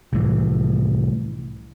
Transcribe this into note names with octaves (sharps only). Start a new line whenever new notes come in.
C2 A2 E3